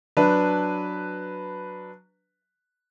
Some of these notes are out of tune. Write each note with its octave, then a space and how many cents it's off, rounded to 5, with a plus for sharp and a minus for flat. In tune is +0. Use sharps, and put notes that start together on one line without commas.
F#3 +0 D4 +0 B4 +0